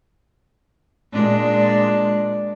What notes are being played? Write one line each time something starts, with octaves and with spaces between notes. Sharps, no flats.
A#2 G#3 D4